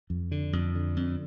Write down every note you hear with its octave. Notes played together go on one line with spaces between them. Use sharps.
F2
D3
F2
D3
F2